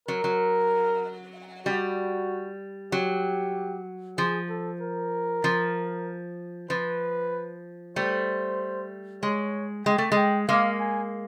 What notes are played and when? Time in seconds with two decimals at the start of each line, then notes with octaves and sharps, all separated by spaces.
0.08 F#3 A#4
0.24 F#3
1.66 G3 F#4
2.92 F#3 G4
4.18 F3 G#4
4.49 A4
4.81 A#4
5.44 F3
6.70 F3 B4
7.96 G3 A3 C5
9.23 G#3 C#5
9.85 G#3 G5
9.98 A3
10.12 G#3 G5
10.48 G#3 A#3 F5
10.80 G#5